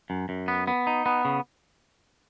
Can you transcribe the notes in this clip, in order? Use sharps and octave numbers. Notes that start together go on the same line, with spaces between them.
F#2
F#2
B3
B3
D#4
B3
C#3